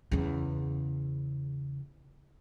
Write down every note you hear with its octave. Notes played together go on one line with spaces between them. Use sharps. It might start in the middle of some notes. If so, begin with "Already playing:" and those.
E2 C#3